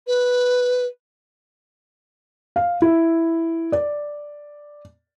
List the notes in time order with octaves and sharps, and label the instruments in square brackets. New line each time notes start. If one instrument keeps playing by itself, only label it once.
[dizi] B4
[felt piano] F5
E4
D5